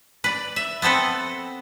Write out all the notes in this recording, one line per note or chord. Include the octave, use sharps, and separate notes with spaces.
B4 D5
E5
B3 C4 A4 B4